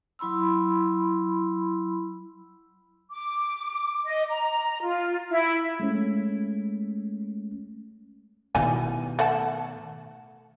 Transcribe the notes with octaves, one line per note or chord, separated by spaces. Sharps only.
F#3 E4 B5 C6 E6
D6
D#5
A#5
F4
E4
G#3 A3 C#4
B2 D#3 E3 G3 G#5
A3 F#5 A5